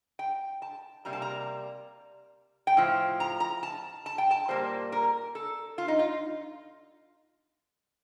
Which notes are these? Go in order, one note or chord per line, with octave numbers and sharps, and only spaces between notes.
G5
A5
C3 G3 A#3 A#5
A5
A#5
G5
A2 F3
A#5
A#5
A5
A5
G5
A5
A#2 G3 A#3 C5
A#4
A4
F4
D#4
F4